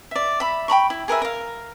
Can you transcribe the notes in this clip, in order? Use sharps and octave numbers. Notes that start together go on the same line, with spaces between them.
D5 E5
E5 B5
G5 A#5 B5 C#6
E4
G#4 A#4 B4 E5
A#4 F5